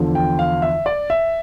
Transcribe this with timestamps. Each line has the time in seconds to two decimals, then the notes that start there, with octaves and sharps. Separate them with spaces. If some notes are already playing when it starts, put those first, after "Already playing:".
Already playing: E2 D3 F3
0.15 G5
0.39 F5
0.62 E5
0.86 D5
1.10 E5